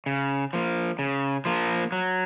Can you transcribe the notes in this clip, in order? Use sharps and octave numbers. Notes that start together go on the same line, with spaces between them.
C#3
F3 A#3
C#3
F3 A#3
F#3